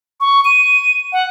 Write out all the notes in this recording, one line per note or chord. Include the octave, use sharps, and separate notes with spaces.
C#6
D#7
F#5